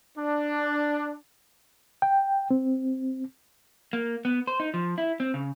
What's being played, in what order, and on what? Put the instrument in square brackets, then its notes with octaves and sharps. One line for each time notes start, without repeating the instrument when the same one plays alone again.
[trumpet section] D4
[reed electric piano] G5
C4
[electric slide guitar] A#3
B3
C5
D#4
F3
E4
C4
C#3